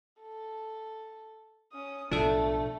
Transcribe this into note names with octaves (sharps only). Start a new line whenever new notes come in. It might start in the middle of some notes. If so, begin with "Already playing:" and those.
A4
C#4 D#6
B1 A2 F3 A3 D4 A4